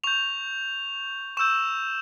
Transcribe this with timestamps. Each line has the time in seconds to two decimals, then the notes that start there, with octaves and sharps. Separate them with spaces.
0.04 C#6 G6 F7
1.37 C#6 E6 G6 E7